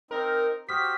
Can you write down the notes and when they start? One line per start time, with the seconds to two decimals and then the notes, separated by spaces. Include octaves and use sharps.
0.11 C4 D#4 A#4
0.69 F#4 G4 C5 D6 D#6 F6 B6